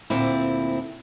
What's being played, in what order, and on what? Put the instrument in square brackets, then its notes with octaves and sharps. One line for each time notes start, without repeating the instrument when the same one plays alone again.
[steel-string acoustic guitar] D2 A#2 C4 E4